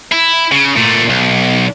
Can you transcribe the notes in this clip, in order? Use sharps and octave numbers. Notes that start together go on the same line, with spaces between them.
E4
C#3
A#2 A3
B1